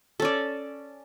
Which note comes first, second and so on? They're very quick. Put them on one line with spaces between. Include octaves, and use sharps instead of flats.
A4 C#4 D5